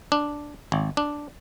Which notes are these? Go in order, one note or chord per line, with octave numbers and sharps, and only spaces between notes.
D4
G#1
D4